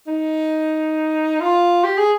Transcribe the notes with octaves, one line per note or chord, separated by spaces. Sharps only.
D#4
F4
G4
G#4